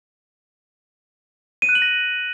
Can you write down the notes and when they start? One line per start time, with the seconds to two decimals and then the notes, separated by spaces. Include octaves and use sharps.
1.62 D#7
1.69 F#6
1.75 F#7
1.82 A#6